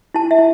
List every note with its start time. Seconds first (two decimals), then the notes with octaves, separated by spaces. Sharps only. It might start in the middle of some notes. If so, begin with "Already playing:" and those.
0.14 E4 A5
0.31 E5
0.39 E4